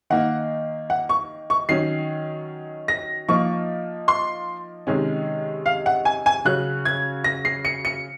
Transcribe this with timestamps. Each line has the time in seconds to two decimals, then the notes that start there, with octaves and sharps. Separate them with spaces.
0.10 D#3 A#3 D#4 F#5
0.90 F#5
1.09 C#6
1.50 C#6
1.69 D#3 F#3 C#4 C7
2.88 A#6
3.29 F3 A#3 D#4 C#6
4.08 C6
4.87 C3 D#3 G#3 C#4
5.66 F5
5.86 F#5
6.05 G#5
6.26 G#5
6.45 C#3 F#3 C#4 F#6
6.85 G#6
7.24 A#6
7.45 C7
7.65 C#7
7.85 C#7